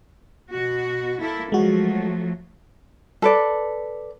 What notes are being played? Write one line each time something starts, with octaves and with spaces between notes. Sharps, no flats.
B2 F#4
A#3 E4 A4
F3 F#3 G#3 A3 F#4
A4 B4 D5